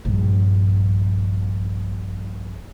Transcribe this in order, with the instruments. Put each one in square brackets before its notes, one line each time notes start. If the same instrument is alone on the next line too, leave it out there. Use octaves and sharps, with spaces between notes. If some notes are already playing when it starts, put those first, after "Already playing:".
[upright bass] A#1 G2